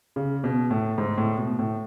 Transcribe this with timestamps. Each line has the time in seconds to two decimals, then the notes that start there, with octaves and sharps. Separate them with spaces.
0.16 C#3
0.44 B2
0.71 A2
0.98 G#2
1.18 A2
1.38 B2
1.59 A2